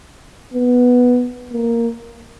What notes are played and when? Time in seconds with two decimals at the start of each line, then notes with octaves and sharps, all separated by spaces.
0.54 B3
1.54 A#3